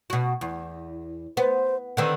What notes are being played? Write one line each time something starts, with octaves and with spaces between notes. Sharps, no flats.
B2 F#4
E2
B3 C5
D3 D#3 C4 B4